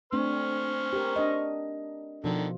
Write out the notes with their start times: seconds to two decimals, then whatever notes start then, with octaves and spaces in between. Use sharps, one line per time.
0.13 A3 C4 D4 C5 C#6 F6
0.93 G4 A#4
1.16 D4 D#5
2.24 B2 D3 D#3 F3 F4